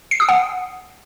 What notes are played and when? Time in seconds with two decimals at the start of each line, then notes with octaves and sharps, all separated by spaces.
0.11 C7
0.20 D#6
0.29 F#5